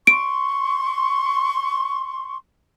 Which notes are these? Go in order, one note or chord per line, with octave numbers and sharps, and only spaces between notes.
C6 C#6 D7